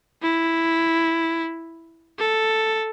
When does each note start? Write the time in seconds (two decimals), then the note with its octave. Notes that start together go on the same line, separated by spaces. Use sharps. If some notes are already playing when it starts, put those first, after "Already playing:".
0.22 E4
2.19 A4